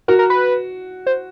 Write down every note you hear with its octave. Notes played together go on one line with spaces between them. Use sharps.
F#4 A#4
A#4
B4
C5